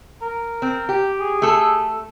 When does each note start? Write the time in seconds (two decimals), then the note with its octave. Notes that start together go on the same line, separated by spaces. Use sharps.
0.22 A#4
0.62 C4
0.89 G4
1.20 G#4
1.42 A3 A4